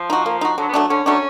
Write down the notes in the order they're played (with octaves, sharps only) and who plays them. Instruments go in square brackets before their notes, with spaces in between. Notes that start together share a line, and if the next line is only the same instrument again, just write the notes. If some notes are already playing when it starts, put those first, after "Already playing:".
Already playing: [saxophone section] F3
[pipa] D#4 F#4
A#3
D#4 F#4
[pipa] D3 [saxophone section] F#3
[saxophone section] B3
[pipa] F#3 A3 D4
[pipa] D3 [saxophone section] C#4
[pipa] F#3 A3 D4 [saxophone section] C#4